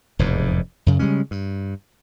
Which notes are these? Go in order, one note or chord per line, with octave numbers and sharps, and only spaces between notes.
F1 E2 G#2 B2
F#2 C#3
C#3 G3 G#3 C#4
G2